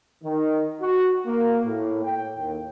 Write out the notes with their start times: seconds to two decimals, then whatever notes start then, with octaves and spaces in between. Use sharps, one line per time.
0.24 D#3
0.82 F#4
1.27 A#3
1.65 A2
2.05 G5
2.38 D#2